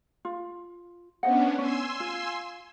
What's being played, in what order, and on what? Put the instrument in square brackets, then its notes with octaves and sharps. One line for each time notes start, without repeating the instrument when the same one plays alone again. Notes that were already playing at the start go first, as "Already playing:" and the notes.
[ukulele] F4
[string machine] B3 C#4 D4 [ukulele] C5 D#5 F#5
[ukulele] C#4 [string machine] G#5 C6 E6
[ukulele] F4